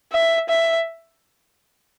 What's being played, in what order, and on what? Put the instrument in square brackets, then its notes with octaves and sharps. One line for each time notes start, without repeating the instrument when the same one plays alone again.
[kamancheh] E5
E5